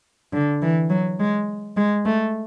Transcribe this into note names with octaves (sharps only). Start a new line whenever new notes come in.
D3
E3
F#3
G#3
G#3
A3